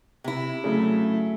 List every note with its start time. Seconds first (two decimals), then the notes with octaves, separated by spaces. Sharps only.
0.24 C3 E4
0.64 C#3 F#3 A3 G#4